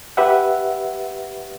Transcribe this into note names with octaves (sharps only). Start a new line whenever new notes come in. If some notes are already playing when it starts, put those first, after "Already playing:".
G4 B4 E5 F#5